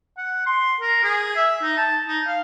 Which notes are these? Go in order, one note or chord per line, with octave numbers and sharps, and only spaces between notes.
F#5
C6
A#4
G#4
E5
D#4
A5
D#4
F5